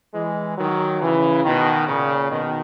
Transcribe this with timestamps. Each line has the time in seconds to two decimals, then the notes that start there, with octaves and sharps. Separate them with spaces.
0.14 E3 G#3
0.57 D#3 F#3
1.01 C#3 E3
1.44 B2 D#3
1.87 A#2 C#3
2.30 B2 D#3